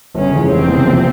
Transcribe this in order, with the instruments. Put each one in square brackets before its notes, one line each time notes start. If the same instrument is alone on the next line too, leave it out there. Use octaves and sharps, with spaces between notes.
[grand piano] G1 [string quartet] C#3 C#4
[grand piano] F2 E3 G#3
[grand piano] F1 [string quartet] C3 C4
[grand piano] E2 C#3
A#1